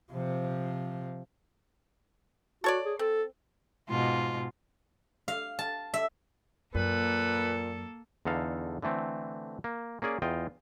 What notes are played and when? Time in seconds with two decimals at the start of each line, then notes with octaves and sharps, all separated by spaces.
0.11 C3 F3
2.64 F#4 A4 C#5 D5
2.85 G#4
2.99 C4 A4
3.89 G#2 B2 F4
5.28 F5
5.59 A5
5.94 E5
6.75 F#2 A#2 A#3 A4 B4
8.25 E2 D3 D#4 A4 F5
8.82 D3 E3 A3 C4
9.64 A#3
10.02 A#3 C#4 G#4 D5
10.22 E2 F4 D#5 G5